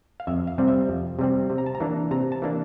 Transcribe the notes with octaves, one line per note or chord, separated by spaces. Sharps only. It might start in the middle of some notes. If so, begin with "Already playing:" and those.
F5
F2 E5
F5
C3 G3 C4
E5
F2
C3 G3 C4
C3
A#5
A5
A#5
E3 A#3 D4
C3 A#5
A5
E3 A#3 D4